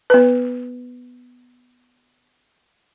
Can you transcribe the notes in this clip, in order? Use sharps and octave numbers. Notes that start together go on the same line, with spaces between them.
B3 B4